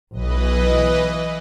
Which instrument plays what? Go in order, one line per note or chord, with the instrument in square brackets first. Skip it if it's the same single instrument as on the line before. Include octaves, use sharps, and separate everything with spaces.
[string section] B1 [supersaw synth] E3 B4 D#5